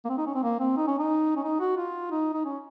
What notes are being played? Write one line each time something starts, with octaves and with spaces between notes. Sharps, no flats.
A#3
C4
D#4
C#4
C4
A#3
C4
D#4
C#4
D#4
C#4
D#4
F#4
F4
D#4
D#4
C#4